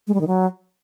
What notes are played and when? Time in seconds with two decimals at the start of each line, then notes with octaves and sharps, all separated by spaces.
0.07 G#3
0.14 G3
0.21 D#3
0.27 F#3